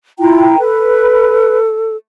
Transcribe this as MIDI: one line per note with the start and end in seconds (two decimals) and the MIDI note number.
0.19 0.58 64
0.19 0.45 65
0.19 0.58 79
0.19 0.58 82
0.58 1.96 69
0.58 1.58 71